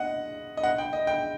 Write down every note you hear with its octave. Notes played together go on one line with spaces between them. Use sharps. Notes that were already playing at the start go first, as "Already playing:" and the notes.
Already playing: D#5 F#5
D#5
F#5
G5
D#5
G5